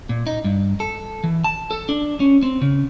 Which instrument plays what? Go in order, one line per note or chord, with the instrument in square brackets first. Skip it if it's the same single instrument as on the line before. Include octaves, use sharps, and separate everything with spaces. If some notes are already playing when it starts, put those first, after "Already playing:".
[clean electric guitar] A#2
D#4
G2
A4
E3
A5
A4
D4
C#4
C4
C#3